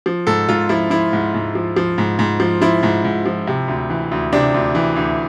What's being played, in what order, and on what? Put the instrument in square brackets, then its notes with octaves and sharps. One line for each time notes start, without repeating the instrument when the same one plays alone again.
[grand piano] F3
G#2 A4
G#2 F4
F3 E4
F3 E4
G#2
G#2
F3
F3
G#2
G#2
F3
F3 E4
G#2
G#2
F3
C3
D2
E3
D2
C3 D4
D2
E3
D2